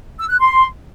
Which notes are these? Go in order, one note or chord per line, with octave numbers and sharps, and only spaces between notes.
E6
F#6
C6